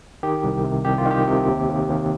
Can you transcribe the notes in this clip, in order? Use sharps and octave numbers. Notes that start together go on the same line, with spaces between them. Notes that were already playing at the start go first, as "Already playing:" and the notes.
D#3 G4
C2
C3
C2 G4
F4
D#3
G4
C3
D#2
D#2
D#2